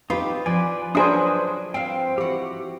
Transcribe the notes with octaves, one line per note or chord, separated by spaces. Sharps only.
C4 D#4 F4 G4 B4
F3 B4 D5 G#5
F#3 D4 G#4 B4 C5 B5 D#6
C4 F5 G5
E3 F#4 G4